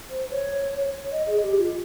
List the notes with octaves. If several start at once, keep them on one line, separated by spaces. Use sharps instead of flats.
C5
C#5
D#5
G#4
G4
F4